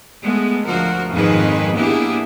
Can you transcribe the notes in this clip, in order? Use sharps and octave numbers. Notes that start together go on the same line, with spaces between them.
G#3 A3 B3
D2 F3 F#4 A#4
F2 G#2 D#3 G#3 G#4 B4
A#3 B3 D4 E4 G4 G#4